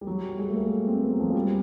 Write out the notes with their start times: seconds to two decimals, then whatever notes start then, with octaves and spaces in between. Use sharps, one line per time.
0.01 G3
0.07 F#3
0.23 G3
0.39 G#3
0.49 A3
0.56 A#3
0.87 C4
1.02 B3
1.13 F#3
1.20 F3
1.30 G#3
1.35 G3